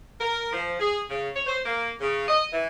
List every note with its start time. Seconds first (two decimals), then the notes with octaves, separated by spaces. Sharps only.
0.20 A#4
0.52 F3
0.80 G#4
1.10 C#3
1.35 C#5
1.46 C5
1.65 A#3
2.01 C#3
2.28 D#5
2.52 E3